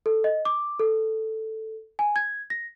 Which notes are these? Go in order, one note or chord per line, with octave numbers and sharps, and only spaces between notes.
A4
D#5
D6
A4
G#5
G#6
A#6